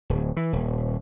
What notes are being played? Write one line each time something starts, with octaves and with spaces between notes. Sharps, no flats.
D1
E3
D#1